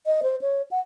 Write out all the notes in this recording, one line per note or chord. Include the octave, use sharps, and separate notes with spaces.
D#5
C5
C#5
F#5